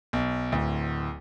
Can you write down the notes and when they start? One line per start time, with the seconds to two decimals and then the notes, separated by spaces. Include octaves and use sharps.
0.13 B1
0.52 D1 D2